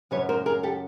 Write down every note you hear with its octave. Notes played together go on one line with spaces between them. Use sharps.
F#2 C#3 F#3 B4 C#5
A#4 C5
G#4 A#4
G4 A4